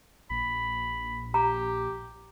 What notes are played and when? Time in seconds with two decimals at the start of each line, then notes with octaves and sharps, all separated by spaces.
0.30 A#1 B5
1.34 G4 A#5